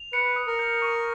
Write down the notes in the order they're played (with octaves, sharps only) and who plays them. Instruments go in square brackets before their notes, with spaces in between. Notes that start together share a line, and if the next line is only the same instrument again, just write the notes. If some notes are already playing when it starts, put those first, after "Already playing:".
Already playing: [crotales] F7
[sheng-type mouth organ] B4 [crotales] C#7
[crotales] D#6
[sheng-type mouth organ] A#4
[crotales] G6
C#6